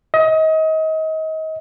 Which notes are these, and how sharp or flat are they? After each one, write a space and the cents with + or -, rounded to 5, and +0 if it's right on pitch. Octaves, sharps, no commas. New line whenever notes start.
D#5 +30